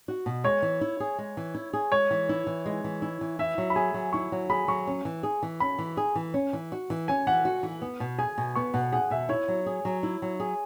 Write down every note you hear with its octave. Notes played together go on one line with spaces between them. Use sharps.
F#4
B2
G#3 C#5
E3
E4
G#4
G#3
E3
E4
G#4
G#3 C#5
E3
E4
E3
G#3
E3
E4
E3
E4 E5
F#3
B5
G#4 G#5
F#3
E4 C#6
F#3
G#4 B5
F#3 C#6
C#4
E3
G#4
E3
C#4 B5
E3
G#4
E3
C#4
E3
F#4
E3
C#4 G#5
E3 F#5
F#4
E3
B3
B2
G#4 G#5
B2
B3 C#6
B2 F#5
G#4 F#5
B2 E5
E4 C#5
F#3
G#4
F#3
E4
F#3
G#4